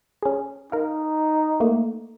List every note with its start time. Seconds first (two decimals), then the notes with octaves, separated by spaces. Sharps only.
0.23 C#4 G#4
0.72 D#4 A#4 F5
1.60 A3 A#3